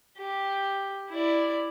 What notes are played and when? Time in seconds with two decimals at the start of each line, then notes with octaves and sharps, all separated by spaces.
0.18 G4
1.10 E4 D5